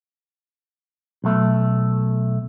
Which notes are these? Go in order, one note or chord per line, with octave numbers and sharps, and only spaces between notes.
B1 A3